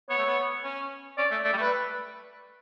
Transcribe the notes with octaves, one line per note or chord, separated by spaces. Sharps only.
B3 C#5
A3
B3
C#4
C#4 D5
A3
A3 D5
G3
A3
B4